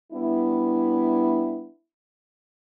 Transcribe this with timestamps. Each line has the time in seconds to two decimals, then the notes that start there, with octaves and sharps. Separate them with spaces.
0.13 G3 B3 D4 E4